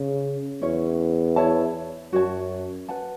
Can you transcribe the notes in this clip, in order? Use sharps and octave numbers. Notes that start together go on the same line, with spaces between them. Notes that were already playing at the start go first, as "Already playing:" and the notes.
Already playing: C#3
E2 C#4 E4 C#5
E4 C#5 A5
F#2 F#4 C#5 A5
B4 F#5 A5